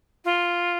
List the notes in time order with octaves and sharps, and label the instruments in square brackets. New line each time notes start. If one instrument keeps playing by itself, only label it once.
[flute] F4